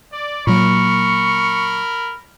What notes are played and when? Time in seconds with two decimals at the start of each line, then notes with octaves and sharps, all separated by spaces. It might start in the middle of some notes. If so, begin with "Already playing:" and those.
0.13 D5
0.47 A#2 F#3 A#3 A#4 B5 C#6